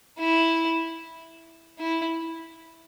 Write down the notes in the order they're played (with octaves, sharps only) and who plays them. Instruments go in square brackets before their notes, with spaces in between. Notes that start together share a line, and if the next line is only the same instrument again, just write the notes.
[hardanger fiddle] E4
E4